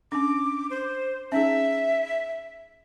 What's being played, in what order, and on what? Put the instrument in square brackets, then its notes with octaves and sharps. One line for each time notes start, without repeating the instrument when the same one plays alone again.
[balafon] C#4 D4 [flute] D6
[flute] C5
[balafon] C#4 D#4 G#4 [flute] E5